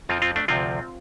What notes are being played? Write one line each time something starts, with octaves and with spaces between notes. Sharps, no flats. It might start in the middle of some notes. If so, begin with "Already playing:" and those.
F2 F3 C4 F4
C4 F4
A3 D4
D2 C3 F3 C4 F4